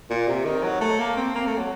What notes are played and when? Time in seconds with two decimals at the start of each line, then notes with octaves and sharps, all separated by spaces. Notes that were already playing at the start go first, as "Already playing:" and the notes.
0.10 A#2
0.27 C3
0.45 D#3
0.63 F#3
0.81 A3
0.99 A#3
1.16 C4
1.35 A#3
1.47 A3
1.58 F#3